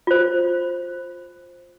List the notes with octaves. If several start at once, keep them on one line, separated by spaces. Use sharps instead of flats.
F4 C5